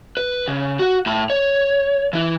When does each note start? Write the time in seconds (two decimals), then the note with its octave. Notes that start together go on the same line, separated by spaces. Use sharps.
0.17 B4
0.48 C#3
0.79 F#4 F#5
1.06 A2 B5
1.30 C#5
2.13 E3 E4